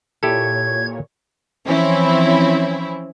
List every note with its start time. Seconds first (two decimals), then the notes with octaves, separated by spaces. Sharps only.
0.23 A#2 E4 G4 A4 C#5 G#6
1.66 E3 F3 C4 C#4 E4